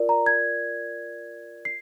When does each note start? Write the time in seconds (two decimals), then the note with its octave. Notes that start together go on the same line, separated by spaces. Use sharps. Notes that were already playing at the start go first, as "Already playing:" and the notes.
Already playing: F4 A#4 D5
0.09 A#5
0.26 G#6
1.65 C7